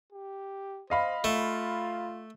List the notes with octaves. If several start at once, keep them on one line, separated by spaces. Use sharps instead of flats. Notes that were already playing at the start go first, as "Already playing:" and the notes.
G4
C5 D#5 F5 B5
A3 F4